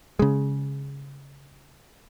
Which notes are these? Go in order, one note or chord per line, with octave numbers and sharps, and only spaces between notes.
C#3 G#3